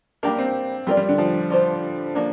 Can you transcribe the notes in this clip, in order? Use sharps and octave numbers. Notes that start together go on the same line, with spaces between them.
G3 A#3 D4 G4 A#4
C4
G3 C4 F4 A#4 D5
G3
D3
F3
D4 F4 C5
F3 A#3 D4